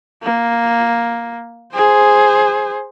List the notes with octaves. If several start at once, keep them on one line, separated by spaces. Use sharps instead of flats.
A#3
G#4 C5